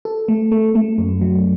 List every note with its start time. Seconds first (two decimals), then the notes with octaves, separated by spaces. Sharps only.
0.05 A4
0.28 A3
0.52 A3
0.75 A3
0.98 F#2
1.21 F#3